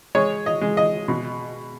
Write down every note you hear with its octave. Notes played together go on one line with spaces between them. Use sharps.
G#3 C#5
D#5
G#3
D#5
B2